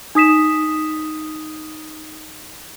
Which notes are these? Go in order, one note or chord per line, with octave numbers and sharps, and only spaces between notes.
D#4 D#6 B6 E7